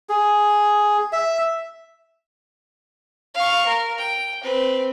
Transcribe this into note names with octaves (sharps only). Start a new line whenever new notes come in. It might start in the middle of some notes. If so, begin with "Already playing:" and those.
G#4
E5
F5 C#6
A#4
G5
C4 B4